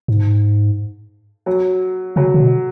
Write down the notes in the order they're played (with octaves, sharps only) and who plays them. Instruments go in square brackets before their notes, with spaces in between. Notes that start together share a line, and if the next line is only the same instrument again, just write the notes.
[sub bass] G#2
[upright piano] F#3
[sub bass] C#3 [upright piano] F#3
[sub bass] C#3
B2